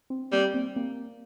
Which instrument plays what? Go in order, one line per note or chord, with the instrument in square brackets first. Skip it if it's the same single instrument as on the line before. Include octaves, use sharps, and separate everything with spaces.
[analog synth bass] C4
[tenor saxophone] G3 [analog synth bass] A#3
[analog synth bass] C4
A#3